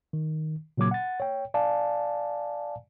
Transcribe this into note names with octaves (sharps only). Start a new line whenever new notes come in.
D#3
A#2 C#3 F#3 A#3 D6 G#6
F#5 A6
C#5 G5
D5 F5 G#5 A5